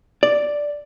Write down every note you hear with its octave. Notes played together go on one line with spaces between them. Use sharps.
D5